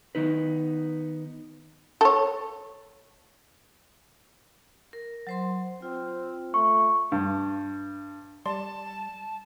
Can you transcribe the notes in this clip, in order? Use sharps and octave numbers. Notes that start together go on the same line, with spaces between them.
D#3 B3 D#4 B4
A4 C#5
A#4
F#3 C5 C6
C4 F4
A3 C#6
G2
G3 D5 A5 C6